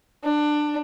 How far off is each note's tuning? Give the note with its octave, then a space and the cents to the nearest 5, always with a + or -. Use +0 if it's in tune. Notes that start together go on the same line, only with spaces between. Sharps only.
D4 +20